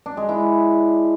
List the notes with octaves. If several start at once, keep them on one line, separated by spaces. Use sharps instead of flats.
D4
G#3
E4